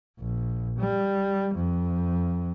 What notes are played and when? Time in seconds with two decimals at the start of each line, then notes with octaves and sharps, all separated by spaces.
0.19 A#1
0.79 G3
1.55 F2